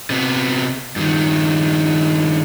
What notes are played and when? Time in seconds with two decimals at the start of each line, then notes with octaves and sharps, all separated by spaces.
0.10 C3 B3
0.96 G2 D#3